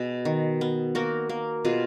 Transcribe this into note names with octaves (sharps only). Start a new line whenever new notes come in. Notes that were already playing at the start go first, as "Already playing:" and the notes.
Already playing: B2 B3 G#4
D#3
B3
A#3 F#4 A#4
A#3
B2 F4 G#4